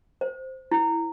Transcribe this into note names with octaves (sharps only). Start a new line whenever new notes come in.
C5
E4